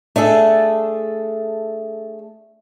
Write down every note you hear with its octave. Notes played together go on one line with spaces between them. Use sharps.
A3 D4 G#4 A4